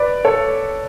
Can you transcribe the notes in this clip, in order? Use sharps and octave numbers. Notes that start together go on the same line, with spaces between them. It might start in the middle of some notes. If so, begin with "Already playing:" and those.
Already playing: B4 D5
A4 C#5